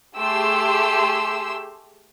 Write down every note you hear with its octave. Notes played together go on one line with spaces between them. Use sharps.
A3 G4 G#4 C6 E6